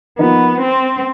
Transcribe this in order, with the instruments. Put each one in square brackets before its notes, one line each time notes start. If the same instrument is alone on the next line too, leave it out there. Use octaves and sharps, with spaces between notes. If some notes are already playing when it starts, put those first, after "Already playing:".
[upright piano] F3 A#3 D#4 [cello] B3
[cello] C4